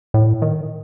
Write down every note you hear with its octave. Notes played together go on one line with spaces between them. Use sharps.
A2
D#3